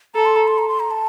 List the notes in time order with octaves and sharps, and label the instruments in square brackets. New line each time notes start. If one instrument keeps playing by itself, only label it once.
[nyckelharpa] A4 [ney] A#5
[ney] C6
A#5
C6
A#5
C6
A#5
A5